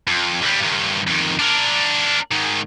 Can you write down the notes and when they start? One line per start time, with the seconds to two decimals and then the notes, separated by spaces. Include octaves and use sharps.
0.07 F2
0.42 D#2 G3
0.60 G2 D#3
1.07 F2 D#3
1.39 D4 A#4
2.32 G#2 D#3